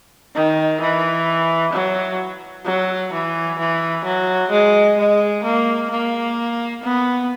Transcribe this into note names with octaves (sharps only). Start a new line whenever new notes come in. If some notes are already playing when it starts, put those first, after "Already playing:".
D#3
E3
F#3
F#3
E3
E3
F#3
G#3
G#3
A#3
A#3
B3